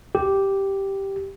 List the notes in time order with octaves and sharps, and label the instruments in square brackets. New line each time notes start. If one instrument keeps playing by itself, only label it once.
[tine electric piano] G4